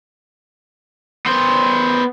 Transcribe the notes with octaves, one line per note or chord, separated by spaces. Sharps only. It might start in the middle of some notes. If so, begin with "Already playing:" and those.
B3 C5